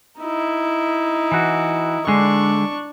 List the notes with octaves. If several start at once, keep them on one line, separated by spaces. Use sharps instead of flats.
D#4 E4
E3 F#4
D3 G#3 D4 C#6